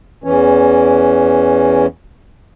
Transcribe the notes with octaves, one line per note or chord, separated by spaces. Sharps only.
E2 E3 C#4